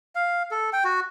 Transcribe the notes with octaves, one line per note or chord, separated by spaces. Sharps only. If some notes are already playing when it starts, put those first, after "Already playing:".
F5
A4
G5
F#4